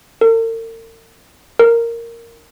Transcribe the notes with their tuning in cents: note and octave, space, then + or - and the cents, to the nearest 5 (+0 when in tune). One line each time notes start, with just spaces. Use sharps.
A#4 -45
A#4 -5